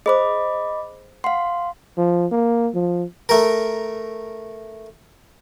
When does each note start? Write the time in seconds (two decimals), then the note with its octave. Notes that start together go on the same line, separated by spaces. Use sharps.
0.06 G#4 C5 D#5 B5 D6
1.24 F5 F#5 C6
1.98 F3
2.32 A#3
2.75 F3
3.29 A3 A#4